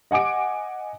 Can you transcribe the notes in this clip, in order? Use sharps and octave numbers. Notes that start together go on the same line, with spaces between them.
D#5 F#5 G#5 D6 D7